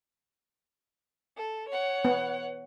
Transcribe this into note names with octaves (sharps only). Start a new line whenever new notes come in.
A4
C#5 F#5
B3